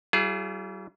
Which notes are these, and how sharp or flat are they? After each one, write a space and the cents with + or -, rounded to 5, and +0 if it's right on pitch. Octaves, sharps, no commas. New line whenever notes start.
G3 -40 F4 -40 G#4 +25